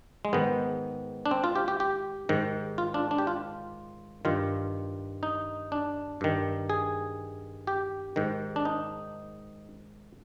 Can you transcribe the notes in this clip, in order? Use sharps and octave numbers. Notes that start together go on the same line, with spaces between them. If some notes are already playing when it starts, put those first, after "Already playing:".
G#3
G#2 D#3 B3
D4
C4
F4
G4
G4
G4
G#2 D#3
F4
D4
D4
G4
F4
G2 D#3 F4
D#4
D4
G2 D#3
G#4
G4
G#2 D#3
D4
D#4